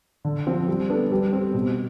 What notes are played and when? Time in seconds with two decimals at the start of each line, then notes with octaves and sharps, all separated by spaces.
0.25 D3
0.47 F3 C4
0.68 G3
0.89 B3 D4 A4
1.11 G3
1.33 C4 G4
1.54 B2